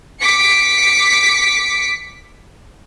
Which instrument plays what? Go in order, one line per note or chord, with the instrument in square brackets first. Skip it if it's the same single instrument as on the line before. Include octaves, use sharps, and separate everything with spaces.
[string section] D6 B6 C#7